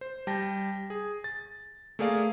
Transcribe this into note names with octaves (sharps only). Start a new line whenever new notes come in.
C5
G3 G5 A5 A#6
G#4
A6
A3 A#3 G#4 D5 F5